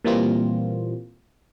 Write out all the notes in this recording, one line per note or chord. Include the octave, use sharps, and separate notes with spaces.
A#2 E3 G3 A#3 C4 F4